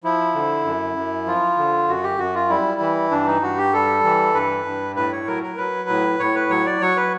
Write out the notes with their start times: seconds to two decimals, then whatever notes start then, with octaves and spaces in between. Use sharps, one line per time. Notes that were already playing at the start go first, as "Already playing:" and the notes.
0.04 F3 E4
0.35 D3
0.65 F#2
0.96 F#2
1.26 F3 F4
1.58 D3
1.88 F#2 F#4
2.03 G4
2.19 F#2 F#4
2.35 F4
2.49 G3 E4
2.81 E3
3.11 G2 D4
3.27 D#4
3.42 G2 F#4
3.58 G4
3.73 G3 A4
4.04 E3
4.34 G2 B4
4.65 G2
4.96 A2 B4
5.12 C#5
5.27 F#3 A#4
5.43 A#4
5.57 F#3 B4
5.89 A2
6.19 A2 C#5
6.35 B4
6.50 F#3 C#5
6.66 D5
6.81 F#3 C#5
6.96 B4